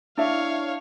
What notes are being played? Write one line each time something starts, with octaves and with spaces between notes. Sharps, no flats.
D4 E4 C#5 E5 F5